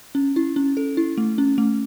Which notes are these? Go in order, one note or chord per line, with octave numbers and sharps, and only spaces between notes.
C#4
E4
C#4
A4
E4
A3
C#4
A3